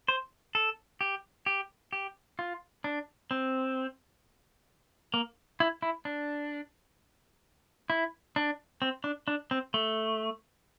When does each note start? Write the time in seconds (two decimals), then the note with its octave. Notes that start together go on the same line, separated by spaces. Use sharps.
0.08 C5
0.55 A4
1.01 G4
1.46 G4
1.93 G4
2.39 F4
2.84 D4
3.31 C4
5.14 A#3
5.60 E4
5.82 E4
6.05 D4
7.90 E4
8.36 D4
8.82 C4
9.04 D4
9.28 D4
9.51 C4
9.74 A3